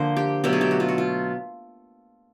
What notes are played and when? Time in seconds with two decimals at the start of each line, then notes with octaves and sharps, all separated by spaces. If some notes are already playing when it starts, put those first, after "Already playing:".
Already playing: D3 F3 A#3 C5
0.17 G4
0.44 B2 F#3 A3 G4
0.53 G#4
0.61 G4
0.71 F#4
0.80 F4
0.88 F#4
0.98 F4